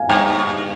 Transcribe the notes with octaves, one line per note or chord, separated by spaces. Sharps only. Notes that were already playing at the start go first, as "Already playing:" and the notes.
Already playing: F5 G#5
G2 G5 A#5